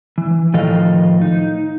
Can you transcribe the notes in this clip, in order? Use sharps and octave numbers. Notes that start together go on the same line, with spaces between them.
E3
A2 D#3 F3 A4 D#5 F5
D#4